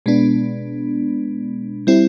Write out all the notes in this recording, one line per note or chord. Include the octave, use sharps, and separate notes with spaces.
B2 G#3 B3 D4
G3 C4 E4